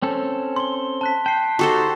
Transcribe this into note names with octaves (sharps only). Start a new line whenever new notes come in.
C4 C#4 A4
C6 G7
A5 F#6 B6
G5 A5 C7
D#4 F#4 G4 A4 C5